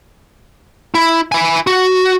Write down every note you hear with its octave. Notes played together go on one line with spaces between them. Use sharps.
E4
E4 G#5
F#4